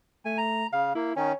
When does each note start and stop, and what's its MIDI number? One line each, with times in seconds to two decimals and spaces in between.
0.25 0.65 57
0.25 0.38 80
0.38 0.67 82
0.73 0.93 49
0.73 0.91 77
0.95 1.13 58
0.95 1.13 64
1.16 1.32 51
1.16 1.32 61
1.16 1.35 73